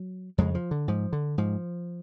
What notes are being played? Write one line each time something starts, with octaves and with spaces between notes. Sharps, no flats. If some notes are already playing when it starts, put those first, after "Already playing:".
Already playing: F#3
F2 C#3 G#3
F3
D3
G#2 F3
D3
G#2 F3